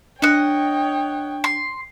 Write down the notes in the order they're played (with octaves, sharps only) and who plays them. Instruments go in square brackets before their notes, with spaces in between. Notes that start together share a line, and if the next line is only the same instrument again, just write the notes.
[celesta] D4 [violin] C#5 G5 [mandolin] D#5 F#5
[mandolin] C6